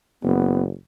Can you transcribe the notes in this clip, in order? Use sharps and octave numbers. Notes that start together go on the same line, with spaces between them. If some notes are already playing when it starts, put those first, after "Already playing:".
F#1 B3